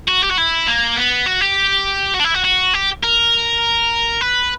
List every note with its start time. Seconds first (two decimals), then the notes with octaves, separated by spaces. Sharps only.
0.08 F#4
0.23 G4
0.31 F#4
0.38 E4
0.67 A#3
0.96 B3
1.26 F#4
1.41 G4
2.14 F#4
2.20 D4
2.24 E4
2.34 F#4
2.44 F#4
2.74 G4
3.03 A#4
4.21 B4